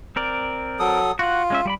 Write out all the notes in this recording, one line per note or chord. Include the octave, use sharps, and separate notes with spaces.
C4 A#4 D5
F#3 A4 D#6
F4 F#4 F#5
G#3 C#4 E5
G3 D5 B5